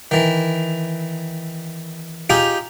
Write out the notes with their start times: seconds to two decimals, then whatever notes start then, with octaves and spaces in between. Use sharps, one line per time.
0.11 D#3 E3
2.30 D#4 F4 G4 G#4